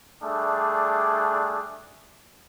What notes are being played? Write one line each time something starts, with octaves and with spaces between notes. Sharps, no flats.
G3 A3 D4 G#4